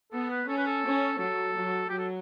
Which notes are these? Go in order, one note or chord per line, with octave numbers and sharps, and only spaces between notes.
B3 A4
B4
C#4 A4
B4
A4
C#4
F#3 A4
F#3
F#3 G4
A4